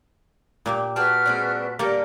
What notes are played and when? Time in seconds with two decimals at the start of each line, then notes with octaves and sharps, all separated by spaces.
0.66 A#2 A#3 G4
0.96 F#4 G#4 A4 B4 G5 A5 F6
1.26 G#3 C4 D4
1.79 D3 G3 A#3 A4 A#4